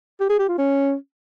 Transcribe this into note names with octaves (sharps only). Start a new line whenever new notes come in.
G4
G#4
G4
F4
C#4